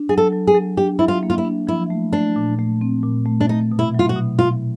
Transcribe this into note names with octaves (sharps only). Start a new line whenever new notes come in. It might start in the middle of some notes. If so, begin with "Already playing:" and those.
Already playing: D4
F#3 G#4
A4
F#3
G#4
F#3
D4 G4
F#3 E4
F4
A#3
F4
E4
D4
F3 E4
A3
A3 D4
A#2
A3
C4
A#2
A3
D4
A3 D#4
B2
E4
F#3 F4
F#4
B2
B2 F4